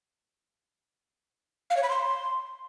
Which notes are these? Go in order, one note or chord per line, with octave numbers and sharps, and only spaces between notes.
F5
C#5
B5
C6